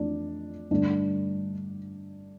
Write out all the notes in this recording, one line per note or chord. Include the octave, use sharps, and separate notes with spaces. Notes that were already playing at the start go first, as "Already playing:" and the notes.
Already playing: F2 E3 A3 D4
G2 D3 A3 D4